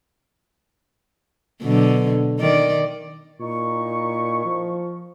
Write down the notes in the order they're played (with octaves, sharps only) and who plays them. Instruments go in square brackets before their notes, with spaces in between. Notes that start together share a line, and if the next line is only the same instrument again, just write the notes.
[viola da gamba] B2 D3 F#3
D#3 D5
[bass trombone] A#2 [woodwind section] D#4 E4 C#6
[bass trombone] F3